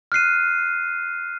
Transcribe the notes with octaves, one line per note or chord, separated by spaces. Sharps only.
F6 F#6 C7 D#7